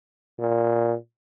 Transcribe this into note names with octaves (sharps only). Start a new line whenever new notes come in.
A#2